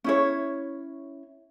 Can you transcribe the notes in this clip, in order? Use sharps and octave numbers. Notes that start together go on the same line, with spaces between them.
C#4 E4 C#5